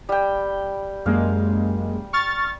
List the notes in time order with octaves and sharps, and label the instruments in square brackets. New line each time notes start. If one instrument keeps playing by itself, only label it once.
[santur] G3 G5
[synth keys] F#2 G#3 A#3 [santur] F5
[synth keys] C#6 F6 A6